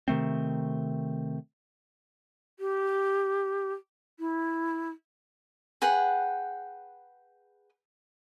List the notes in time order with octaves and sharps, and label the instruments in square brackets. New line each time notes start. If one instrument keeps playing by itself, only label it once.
[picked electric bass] C3 D#3 A3 C4
[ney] G4
E4
[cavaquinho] G#4 B4 F#5 G5